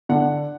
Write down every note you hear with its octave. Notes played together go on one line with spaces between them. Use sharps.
D3 F#5